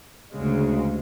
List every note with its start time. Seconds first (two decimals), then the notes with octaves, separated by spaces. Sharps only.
0.32 D2 C#3 G#3